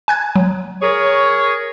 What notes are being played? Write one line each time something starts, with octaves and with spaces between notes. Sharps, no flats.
G#5 F#6 G#6
F#3
G#4 A#4 C#5